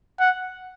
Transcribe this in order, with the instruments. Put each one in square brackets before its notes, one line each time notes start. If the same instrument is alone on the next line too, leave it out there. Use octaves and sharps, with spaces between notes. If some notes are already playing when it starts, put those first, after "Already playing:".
[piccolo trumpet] F#5